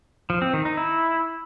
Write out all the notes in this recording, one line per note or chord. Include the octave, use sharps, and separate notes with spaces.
F3
C4
D#3
D#4
E4